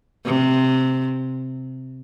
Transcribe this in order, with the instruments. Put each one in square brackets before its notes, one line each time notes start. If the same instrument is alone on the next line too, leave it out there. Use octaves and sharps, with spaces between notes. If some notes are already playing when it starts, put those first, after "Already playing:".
[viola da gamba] C3